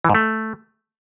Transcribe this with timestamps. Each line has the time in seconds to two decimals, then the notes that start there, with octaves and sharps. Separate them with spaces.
0.05 E3
0.10 G#2
0.15 A3